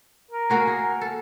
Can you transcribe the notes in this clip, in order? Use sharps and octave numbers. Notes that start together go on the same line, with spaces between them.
A#4
A#3 F#4 G#4
G#4
A4